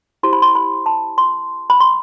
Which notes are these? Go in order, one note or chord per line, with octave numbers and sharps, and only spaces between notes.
E4 G4 C5 C6
B5
C6
B5
A5
C6
B5
C6